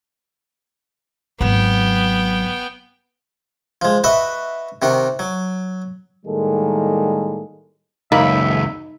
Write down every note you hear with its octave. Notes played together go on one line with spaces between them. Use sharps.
G#1 F#3 B3 G5
F3 G#3
F#4 B4 D#5 E5
C3 D#3 F#4
F#3
A2 D#3 G3 G#3 A#3 A4
C#2 F#2 A#3 D#4 E5 B5